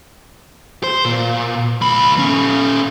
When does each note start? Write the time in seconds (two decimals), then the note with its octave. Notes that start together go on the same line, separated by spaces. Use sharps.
0.84 C5
1.05 A#2
1.81 C#2 B5
2.18 A#2 C#4